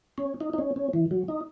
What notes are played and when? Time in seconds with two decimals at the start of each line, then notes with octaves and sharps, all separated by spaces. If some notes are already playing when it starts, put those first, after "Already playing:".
0.18 C#4
0.41 D#4
0.54 D#4
0.58 C#4
0.76 C#4
0.93 E3
1.11 F#3
1.28 D#4